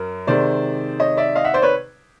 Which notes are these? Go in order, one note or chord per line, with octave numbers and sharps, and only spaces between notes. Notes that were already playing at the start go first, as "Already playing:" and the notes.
Already playing: F#2 A#4
C3 D#3 G#3 C5 D5
C#5 D#5
D5 E5
D#5 F5
E5 F#5
C5 D5
B4 C#5